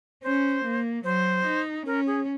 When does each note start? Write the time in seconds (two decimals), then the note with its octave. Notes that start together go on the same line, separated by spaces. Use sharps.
0.23 C#4 C5
0.64 A#3
1.04 F#3 C5
1.45 D#4
1.86 C#4 A#4
2.06 G#4